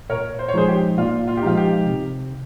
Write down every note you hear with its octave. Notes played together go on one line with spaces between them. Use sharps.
A#2 A#4 C#5
C5
C#5
F3 G#3 D#4 G#4 C5
G4
A#2 F4
F4
G4
F3 G#3 D#4 F4
G4
C3